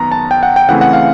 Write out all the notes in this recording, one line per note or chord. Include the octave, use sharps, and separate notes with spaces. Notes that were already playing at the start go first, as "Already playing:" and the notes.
Already playing: F#2 D#3 B3 A#5
A5
G5
F#5
G5
C#3 E3 A3 C4 F#5
F#5
F5